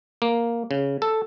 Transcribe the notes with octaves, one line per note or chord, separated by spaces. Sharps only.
A#3
C#3
A4